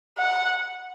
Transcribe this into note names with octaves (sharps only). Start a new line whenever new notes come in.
F#5